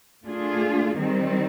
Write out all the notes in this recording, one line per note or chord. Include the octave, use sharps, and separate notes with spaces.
A3 D4 F4 G#4
D#3 G3 C4